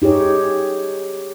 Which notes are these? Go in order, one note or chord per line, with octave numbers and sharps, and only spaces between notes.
D#4 G4 G#4 C#5